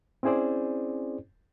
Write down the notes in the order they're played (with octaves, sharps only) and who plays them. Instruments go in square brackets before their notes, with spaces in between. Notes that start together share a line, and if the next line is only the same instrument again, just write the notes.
[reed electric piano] C4 C#4 E4 G#4 C5 D5